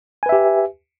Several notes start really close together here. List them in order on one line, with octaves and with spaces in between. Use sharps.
G#5 B4 E5 G4